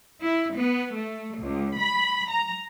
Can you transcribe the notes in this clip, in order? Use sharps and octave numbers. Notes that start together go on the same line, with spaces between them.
E4
B3
A3
C#2
B5
A#5